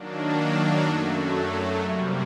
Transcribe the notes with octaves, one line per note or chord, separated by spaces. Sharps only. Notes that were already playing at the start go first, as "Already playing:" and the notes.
Already playing: D#3 F#3 A#3 D4
F#2 F#3 A3
C3 G3 A#3